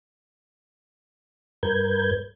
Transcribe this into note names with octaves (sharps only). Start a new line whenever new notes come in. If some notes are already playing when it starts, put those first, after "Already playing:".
G2 A#4 B4 G6 G#6